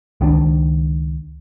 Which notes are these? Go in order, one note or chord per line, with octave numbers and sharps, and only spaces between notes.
C#2 D#3 F3 D4